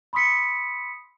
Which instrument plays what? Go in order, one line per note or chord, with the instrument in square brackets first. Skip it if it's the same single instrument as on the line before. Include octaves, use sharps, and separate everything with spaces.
[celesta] B5 C6 D#6 E6 B6 C#7